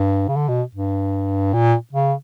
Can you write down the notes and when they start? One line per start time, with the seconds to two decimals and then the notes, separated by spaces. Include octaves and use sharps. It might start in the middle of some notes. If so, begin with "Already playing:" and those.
Already playing: G2
0.28 C#3
0.36 D3
0.48 B2
0.75 G2
1.54 A#2
1.93 C#3